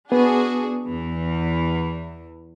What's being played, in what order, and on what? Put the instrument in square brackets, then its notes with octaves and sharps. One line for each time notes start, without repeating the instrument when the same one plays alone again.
[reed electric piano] B3 [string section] D4 F#4 G#4
[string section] E2 E3